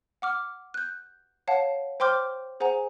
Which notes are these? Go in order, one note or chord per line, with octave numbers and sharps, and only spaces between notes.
F#5 D6 F6
F#6 G6
C#5 F5 F#5 A5
C5 G5 C6 D6 F6 G6
G#4 C5 F#5 G#5 A#5